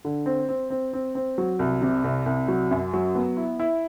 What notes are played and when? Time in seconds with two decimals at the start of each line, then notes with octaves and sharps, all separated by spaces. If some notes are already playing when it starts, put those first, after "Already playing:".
0.05 D3
0.26 C4
0.49 C4
0.70 C4
0.93 C4
1.15 C4
1.38 F#3
1.59 C2
1.82 C3
2.04 C2
2.26 C2
2.48 F#3
2.71 F#2
2.93 F#3
3.15 B3
3.37 E4
3.60 E4